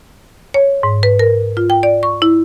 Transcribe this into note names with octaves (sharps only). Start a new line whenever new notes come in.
C#5
G#2
B4
A#4
F4
G5
D5
C#6
E4